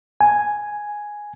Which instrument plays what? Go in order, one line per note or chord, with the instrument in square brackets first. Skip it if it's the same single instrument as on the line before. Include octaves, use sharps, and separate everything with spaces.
[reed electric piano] G#5